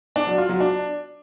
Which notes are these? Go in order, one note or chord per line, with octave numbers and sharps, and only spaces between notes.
D4
F#3
F4
F#3
D4